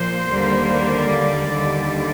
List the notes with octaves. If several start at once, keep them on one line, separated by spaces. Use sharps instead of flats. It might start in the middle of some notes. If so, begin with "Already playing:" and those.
Already playing: A#2 F3 A#3 C5
D#2 D3 G3 A#3
D5
D#2 D3 G3